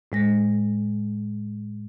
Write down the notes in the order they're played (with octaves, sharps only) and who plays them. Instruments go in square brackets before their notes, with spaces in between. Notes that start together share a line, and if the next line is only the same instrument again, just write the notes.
[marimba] A2 G#3 A#6